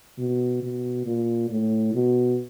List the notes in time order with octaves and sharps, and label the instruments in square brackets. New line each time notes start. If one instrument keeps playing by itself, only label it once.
[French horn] B2
B2
A#2
A2
B2